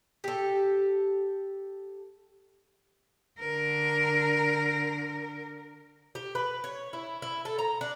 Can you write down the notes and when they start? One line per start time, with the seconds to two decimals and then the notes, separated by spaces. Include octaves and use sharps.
0.24 G4 A4
3.40 D3 A#4
6.15 G4
6.35 B4
6.64 C#5
6.93 E4
7.22 E4
7.45 A4
7.58 A#5
7.81 D4